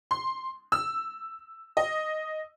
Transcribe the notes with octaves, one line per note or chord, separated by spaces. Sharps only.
C6
E6
D#5